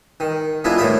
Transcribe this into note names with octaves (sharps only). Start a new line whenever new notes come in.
D#3
G#3 B3 D4 E4 F4
A2 D#3 A#4 E5 G5 D#6